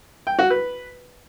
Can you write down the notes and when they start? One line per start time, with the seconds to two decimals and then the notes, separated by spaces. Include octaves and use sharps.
0.27 G5
0.39 F#4
0.50 B4